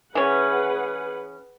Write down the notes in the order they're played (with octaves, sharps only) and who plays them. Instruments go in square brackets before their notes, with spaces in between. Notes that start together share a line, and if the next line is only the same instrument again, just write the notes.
[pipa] E3 C#4 [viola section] G#4 B4 F#5